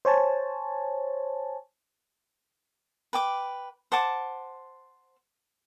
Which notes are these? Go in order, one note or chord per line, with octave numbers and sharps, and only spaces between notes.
C5 C#5 G#5 A5
B4 G5 D6
C5 F#5 A5 D6